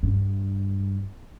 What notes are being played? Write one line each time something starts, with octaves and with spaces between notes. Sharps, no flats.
G2